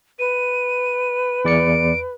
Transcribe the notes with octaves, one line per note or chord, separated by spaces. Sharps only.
B4 D#7
E2 D5 C#7 D7